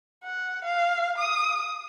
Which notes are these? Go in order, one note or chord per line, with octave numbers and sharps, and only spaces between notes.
F#5
F5
D#6